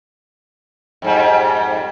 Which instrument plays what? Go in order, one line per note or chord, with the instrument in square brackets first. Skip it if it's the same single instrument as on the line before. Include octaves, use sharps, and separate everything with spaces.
[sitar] F2 G#2 G3